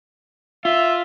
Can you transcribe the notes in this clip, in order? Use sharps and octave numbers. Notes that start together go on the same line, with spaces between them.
F4 E5